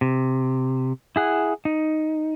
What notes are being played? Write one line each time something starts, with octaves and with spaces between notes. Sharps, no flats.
C3
E4 G#4 F#5
D#4